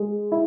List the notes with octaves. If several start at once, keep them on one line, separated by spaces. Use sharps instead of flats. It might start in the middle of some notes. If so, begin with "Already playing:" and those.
Already playing: G#3
E4